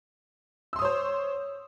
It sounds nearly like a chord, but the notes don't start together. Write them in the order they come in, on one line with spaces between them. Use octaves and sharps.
E6 C6 D#6 C#5 C5